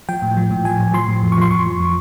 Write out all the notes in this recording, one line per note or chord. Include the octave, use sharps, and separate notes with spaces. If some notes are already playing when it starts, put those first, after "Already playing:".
F3 G5
A2
F3
A2
F3 G#5
A2
F3 C6
A2
F2
C#6
F3 C6
F2 C#6
F3